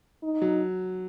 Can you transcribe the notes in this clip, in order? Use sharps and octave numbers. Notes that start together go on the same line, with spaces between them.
D#4
F#3